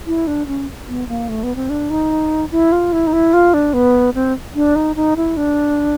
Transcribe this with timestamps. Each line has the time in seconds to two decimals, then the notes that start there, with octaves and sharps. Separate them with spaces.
0.07 E4
0.27 D4
0.47 C#4
0.89 B3
1.08 A#3
1.29 A3
1.43 B3
1.56 C4
1.70 D4
1.90 D#4
2.52 E4
2.72 F4
2.92 E4
3.07 D#4
3.13 E4
3.34 F4
3.54 D4
3.73 B3
4.15 C4
4.55 D4
4.76 D#4
4.96 D#4
5.16 E4
5.37 D4